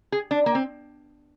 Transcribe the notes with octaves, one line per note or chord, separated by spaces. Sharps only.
G#4
D4
A#3
C4